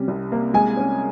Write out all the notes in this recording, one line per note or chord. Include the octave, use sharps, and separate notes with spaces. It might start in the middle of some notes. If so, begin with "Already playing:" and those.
Already playing: C3 G3 C#4
C2
A#3
G#3 G#5
C#4